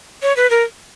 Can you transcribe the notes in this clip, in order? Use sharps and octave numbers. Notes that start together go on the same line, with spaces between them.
C#5
B4
A#4